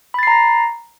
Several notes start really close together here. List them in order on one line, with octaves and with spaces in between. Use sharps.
B5 A6 C7 A#5 A#6